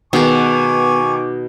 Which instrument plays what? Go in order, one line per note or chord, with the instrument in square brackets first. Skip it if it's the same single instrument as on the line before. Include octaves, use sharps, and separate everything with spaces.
[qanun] B2 G#4 [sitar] D#3 [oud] B3 [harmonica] G#5 C#6 D6